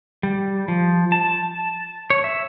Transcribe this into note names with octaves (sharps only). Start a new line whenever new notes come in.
G3
F3
A5
C#5
E5